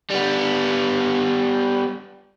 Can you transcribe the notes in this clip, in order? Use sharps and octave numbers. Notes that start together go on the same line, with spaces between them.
G3 B3